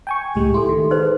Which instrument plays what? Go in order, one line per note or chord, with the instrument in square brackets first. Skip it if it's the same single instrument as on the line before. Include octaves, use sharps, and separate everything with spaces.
[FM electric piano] G5 G#5 C#6
[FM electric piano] C#2 A2 G#3 [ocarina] G4
[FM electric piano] E4 [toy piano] A4 C6
[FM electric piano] D#3
[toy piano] D#4 B4 C5 [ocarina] G#4